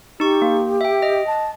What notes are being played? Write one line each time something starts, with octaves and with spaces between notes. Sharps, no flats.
D#4 G4 C#6
A#3
E5 G5
D#5
A5